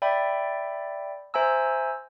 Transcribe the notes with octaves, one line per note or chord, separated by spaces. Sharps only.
D5 E5 G5 B5
C5 E5 G#5 A#5 E6